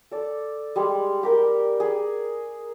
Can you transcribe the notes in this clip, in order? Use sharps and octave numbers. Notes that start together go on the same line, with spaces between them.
A4 D5
G3 G#3
G4 A#4 G5
G#4